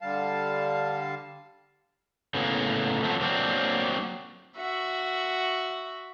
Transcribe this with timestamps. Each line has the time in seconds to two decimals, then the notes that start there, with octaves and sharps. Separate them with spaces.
0.02 D3 G3 F5 A5
2.34 A2 C#3 A#3 B3
3.03 F3 F#3 A3 C4
3.21 F#3 A#3 C4 D4
4.57 F#4 E5